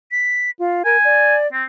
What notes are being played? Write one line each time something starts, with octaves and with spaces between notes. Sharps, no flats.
B6
F4
A#4 G#5
D5
C4